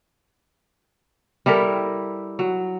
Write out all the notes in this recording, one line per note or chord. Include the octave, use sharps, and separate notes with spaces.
G3 E4 A4 A#4
F#3